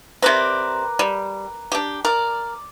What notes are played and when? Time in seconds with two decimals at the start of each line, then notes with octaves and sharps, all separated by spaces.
0.22 C3 C4 A#4 B4 D5
0.99 G3
1.72 D4 G4
2.05 A#4 D5